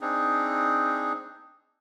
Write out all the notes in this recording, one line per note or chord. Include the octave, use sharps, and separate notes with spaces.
C4 D4 D#4 G#4